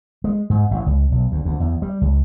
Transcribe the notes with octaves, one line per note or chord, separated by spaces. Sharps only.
G#3
G#2
A1
C#2
B1
D2
D2
E2
G3
C#2